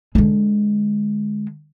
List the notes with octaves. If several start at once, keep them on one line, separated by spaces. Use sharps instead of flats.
D3 G#3